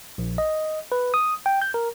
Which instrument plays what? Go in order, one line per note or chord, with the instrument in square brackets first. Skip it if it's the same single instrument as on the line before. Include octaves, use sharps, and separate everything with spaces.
[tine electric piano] A#1
D#5
B4
D#6
G5
G6
A#4